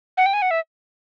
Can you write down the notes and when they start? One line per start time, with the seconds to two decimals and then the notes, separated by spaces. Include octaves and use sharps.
0.17 F#5
0.26 G5
0.34 G#5
0.42 F#5
0.51 E5